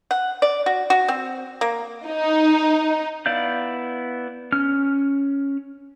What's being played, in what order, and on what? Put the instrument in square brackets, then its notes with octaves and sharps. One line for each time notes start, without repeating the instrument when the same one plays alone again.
[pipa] F#5
D5
F#4
F#4
C4
A#3
[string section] D#4
[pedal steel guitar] B3 E4 D5 F5 G6
C#4 F6